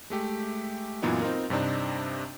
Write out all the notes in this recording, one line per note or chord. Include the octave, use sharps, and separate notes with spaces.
G#3 A3 G4
F#2 A#2 E3 B3 D#4
C4 D#4 F4 A#4
G2 C3 C4 D4 D#4